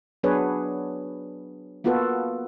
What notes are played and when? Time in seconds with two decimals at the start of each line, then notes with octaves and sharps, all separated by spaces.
0.23 F#3 B3 D4 G#4 B4 C#5
1.84 A#3 B3 F4 F#4 A4 B4